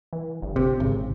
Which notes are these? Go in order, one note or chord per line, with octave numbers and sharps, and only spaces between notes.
E3
G1
C3
G#1 C#3